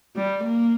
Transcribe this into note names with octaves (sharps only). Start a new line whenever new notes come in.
G3
A#3